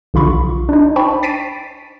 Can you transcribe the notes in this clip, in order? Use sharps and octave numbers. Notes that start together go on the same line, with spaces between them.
B1 D3 F4 B5 C#6
D4 D#4
C5 G5 A5 B5 C#6
A6 B6 C7 D7 D#7